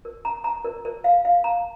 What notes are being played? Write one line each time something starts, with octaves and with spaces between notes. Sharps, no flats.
A#4
A#5
A#5
A#4
A#4
F5
F5
A#5